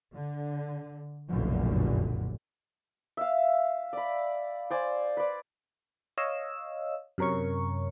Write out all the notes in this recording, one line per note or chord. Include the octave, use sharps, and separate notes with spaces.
D3
F1 B1 F#2 A#2 D3
E5 F5
D5 B5
C5 D5 G#5
B4 D5
C#5 D#5 F5 E6
F#2 C3 A#4 C#5 C#6